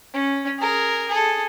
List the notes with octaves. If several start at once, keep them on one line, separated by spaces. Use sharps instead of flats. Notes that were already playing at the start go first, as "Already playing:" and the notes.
C#4
G#4 A#4
G#4 A4